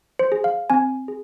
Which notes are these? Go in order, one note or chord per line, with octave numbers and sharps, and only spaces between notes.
C5
G#4
F5
C4 G#5
G#4